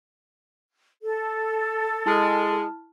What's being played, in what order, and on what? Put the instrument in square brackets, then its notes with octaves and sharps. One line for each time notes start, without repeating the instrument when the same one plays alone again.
[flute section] A4
[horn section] G#3 [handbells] E4 A5 F6